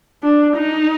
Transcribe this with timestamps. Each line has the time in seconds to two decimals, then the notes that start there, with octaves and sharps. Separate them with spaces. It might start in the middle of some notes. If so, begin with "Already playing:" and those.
0.23 D4
0.57 D#4